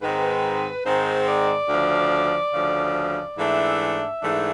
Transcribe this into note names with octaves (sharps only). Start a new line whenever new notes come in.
G#2 D#3 G#3 C4 B4
G#2 D#3 G#3 C4 C5
D5
D2 C#3 F3
D2 C#3 F3
G#2 E3 A3 D4 E5
G#2 E3 A3 D4